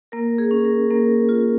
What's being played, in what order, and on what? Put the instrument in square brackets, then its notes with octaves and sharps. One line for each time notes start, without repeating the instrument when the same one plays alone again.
[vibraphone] A#3 A#4
G#4
C#4
A#4
A#3 A#4
F4